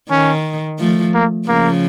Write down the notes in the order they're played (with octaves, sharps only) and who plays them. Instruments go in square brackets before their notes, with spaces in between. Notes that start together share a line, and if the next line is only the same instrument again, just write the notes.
[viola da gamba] D#3 [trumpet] C#4
[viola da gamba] F3 A3
[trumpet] A#3
[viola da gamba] C#3 F3 [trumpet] A#3